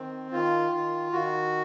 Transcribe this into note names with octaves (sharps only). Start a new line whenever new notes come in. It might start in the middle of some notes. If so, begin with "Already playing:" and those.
Already playing: D#3 C4
D#3 F4
D#3
D#3 F#4